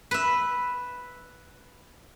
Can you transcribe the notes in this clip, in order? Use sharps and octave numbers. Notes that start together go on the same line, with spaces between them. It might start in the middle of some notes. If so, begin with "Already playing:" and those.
B4 E5